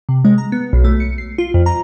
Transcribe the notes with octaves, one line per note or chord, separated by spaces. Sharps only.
C3
G#3
A#5
B3
B1
A3
C#7
C7
F4
F2
A#5